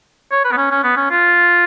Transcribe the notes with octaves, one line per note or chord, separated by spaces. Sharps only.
C#5
B4
B3
C#4
C#4
B3
C#4
F4